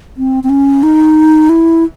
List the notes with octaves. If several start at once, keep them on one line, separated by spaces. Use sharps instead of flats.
C4
C4
C#4
D#4
E4